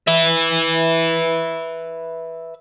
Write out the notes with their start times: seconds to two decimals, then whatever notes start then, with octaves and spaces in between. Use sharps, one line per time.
0.07 B4 E5